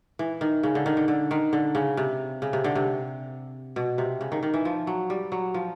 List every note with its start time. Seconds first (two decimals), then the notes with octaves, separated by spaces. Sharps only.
0.19 E3
0.41 D#3
0.63 C#3
0.75 D3
0.86 D#3
0.97 D3
1.08 D3
1.31 D#3
1.53 D3
1.75 C#3
1.97 C3
2.42 C#3
2.53 C3
2.64 D3
2.75 C3
3.76 B2
3.98 C3
4.21 C#3
4.32 D#3
4.43 D#3
4.54 E3
4.65 F3
4.87 F#3
5.10 G3
5.32 F#3
5.54 F3